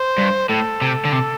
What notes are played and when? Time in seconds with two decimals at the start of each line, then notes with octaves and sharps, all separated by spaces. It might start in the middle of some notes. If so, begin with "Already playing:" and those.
Already playing: C5
0.18 G2
0.49 A2 A4
0.81 C3
1.05 D3
1.13 C3